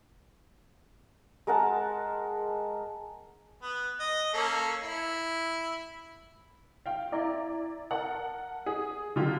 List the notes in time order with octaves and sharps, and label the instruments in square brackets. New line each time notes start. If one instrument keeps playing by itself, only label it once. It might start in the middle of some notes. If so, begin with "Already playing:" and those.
[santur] G#3 A#4 F#5 A5
[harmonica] B3
D#5
A#3 C#4 A4
E4
[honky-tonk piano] F5 G5
E4 D5 A#5
A#4 F#5 A5
G#4
D3 F#3 F4 G4